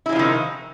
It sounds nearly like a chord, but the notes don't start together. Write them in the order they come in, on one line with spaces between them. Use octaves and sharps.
E4 G#3 F3 C3 D#3